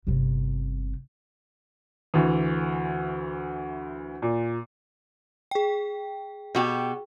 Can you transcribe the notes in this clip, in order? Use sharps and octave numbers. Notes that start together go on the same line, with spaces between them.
G1 C3
D2 E3
A#2
G#4 G5
B2 F#4 G4